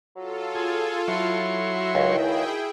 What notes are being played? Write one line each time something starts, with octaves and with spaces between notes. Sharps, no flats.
F#3 F4 A4
G#4
F#3 E4 C#5 C6
F#4 E5
C#2 D#3 E4 G#4 G5